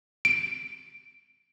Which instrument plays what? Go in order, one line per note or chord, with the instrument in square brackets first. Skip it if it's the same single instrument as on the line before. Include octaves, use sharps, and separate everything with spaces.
[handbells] D7